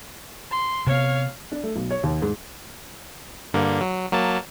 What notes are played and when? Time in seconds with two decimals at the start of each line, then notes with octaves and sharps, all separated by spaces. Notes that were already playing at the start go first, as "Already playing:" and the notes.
0.51 C6
0.87 C3 B3 C#5 F5
1.52 D4
1.64 A3
1.76 B1
1.91 C#5
2.03 D#2
2.22 G#2
3.54 G2 D3 A#3
3.81 F#3
4.12 F#3 A#3 A5